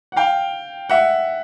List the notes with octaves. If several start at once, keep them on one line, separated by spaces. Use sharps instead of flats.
F#5
F5 G5
E5 F#5